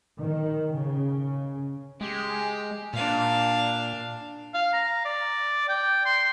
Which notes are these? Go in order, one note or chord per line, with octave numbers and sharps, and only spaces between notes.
D#3
C#3
G#3 G4
A#2 D4 F5
F5
A#5
D5
G5
C6